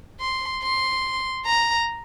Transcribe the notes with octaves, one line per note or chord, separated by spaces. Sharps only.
C6
C6
A#5